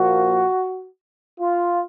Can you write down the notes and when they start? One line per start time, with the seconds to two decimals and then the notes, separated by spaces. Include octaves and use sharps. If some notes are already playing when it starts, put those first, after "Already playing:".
Already playing: A#2 F3 A#3 F#4
1.40 F4